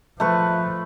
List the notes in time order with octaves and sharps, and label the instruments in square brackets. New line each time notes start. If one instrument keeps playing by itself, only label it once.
[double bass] F3 [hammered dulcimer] A3 B4 C#6